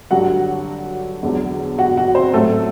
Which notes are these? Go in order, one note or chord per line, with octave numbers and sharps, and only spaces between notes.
G2 D3 F#3 F#4 F#5
E2 D3 F#3
F#4 F#5
F#4 F#5
C4 C5
A2 F#3 A3 A4